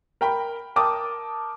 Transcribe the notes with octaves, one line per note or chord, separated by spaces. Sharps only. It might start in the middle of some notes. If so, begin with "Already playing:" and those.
A#4 G5 B5
A#4 G5 A5 D6 D#6